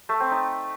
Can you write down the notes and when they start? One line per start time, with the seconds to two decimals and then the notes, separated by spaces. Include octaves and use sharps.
0.09 A3
0.20 C4
0.31 D#4